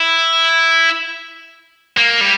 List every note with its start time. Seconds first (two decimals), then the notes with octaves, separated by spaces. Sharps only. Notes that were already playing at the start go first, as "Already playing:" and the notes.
Already playing: E4
1.97 A#3
2.21 G3